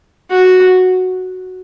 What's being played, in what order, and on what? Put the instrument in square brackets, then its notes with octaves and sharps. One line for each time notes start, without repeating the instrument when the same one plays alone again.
[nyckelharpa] F#4